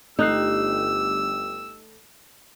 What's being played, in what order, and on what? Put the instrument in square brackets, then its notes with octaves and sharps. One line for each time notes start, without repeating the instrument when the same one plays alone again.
[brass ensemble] G1 G4 [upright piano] A3 F#6 C7 [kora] D#4 [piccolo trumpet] E6